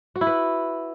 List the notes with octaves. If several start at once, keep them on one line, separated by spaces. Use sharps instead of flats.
F#4
E4
B4